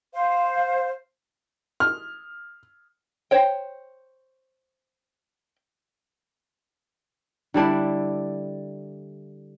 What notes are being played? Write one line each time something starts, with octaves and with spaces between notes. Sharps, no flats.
C5 F5
F6
C5 C#5 G5
D3 G3 D4 E4